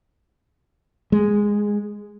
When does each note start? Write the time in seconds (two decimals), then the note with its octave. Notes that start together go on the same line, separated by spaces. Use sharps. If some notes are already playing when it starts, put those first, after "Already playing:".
1.12 G#3